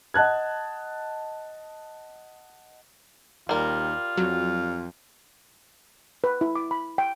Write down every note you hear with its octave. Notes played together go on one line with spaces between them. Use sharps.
D#5 F#5 A5 F#6 G#6
D#2 G3 F4 A#4
F2 F#3
B4
E4
D6
B5
G5